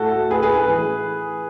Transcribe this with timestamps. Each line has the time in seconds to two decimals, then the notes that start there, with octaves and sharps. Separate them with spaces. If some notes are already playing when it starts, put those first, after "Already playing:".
Already playing: A2 A3 F#4 A4
0.12 A3
0.30 A2 G#4 B4
0.42 G#4 B4
0.49 A2
0.56 G#4 B4
0.68 E3